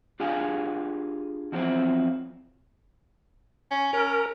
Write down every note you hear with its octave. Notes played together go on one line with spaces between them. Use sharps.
D4 F4 G4 G#4 F5 G#5
E2 F3 F#3 A3 C4 E4
C#4
C#4 A#4